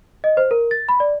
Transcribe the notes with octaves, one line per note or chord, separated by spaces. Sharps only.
D#5
C5
A#4
A6
B5
D5